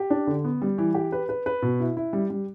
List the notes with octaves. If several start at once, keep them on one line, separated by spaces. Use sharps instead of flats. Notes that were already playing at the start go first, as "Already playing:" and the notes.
Already playing: G4
D4
D3
B3
G3
E3
G4
B4
B4
B4
B2
E4
E4
G3
G3